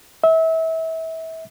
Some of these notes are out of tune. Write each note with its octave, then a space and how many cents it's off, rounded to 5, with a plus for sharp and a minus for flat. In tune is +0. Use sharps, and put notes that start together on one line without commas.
E5 -30